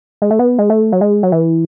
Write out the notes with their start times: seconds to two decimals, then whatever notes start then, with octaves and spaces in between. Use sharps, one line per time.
0.22 G#3
0.31 A3
0.39 B3
0.59 G#3
0.70 A3
0.92 F#3
1.01 G#3
1.23 F#3
1.32 E3